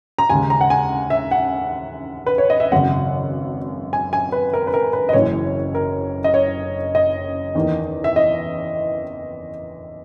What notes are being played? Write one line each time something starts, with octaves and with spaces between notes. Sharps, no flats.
A#5
D#2 C#3 G#3 G#5
A#5
F#5
G#5
E5
F#5
B4
C#5
D#5
E5
G#1 F#2 C#3 F#5
G#5
G#5
B4
A#4
B4
A#4
B4
D#5
F#1 F#2 E3 C#5
A#4
D#5
C#5
D#5
E2 D#3 A#3
E5
D#5